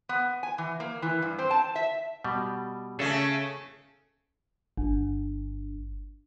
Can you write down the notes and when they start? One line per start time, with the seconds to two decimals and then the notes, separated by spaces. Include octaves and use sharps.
0.09 B3
0.43 G#5
0.58 E3
0.80 A#3
1.02 E3
1.22 G2
1.39 C4
1.51 A5
1.76 E5
2.24 B2 G3
2.99 C#3 A3 G#4 A4 E5
4.78 G1